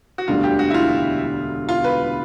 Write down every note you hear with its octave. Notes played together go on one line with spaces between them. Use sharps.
F#4
E1 D2 D3 G3 F4
G4
F#4
E4
F4
F4
B4